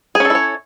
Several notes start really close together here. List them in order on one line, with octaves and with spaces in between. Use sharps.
G#4 C#4 A4 E4 C#5